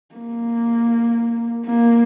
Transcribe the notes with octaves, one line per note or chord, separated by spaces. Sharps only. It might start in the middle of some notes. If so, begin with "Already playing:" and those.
A#3
A#3